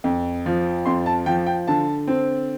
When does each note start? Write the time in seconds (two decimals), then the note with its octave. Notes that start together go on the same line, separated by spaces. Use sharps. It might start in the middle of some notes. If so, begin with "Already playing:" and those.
0.04 F2
0.46 F3
0.85 F2 C6
1.06 A5
1.26 F3 G5
1.46 G5
1.67 D3 A5
2.08 C4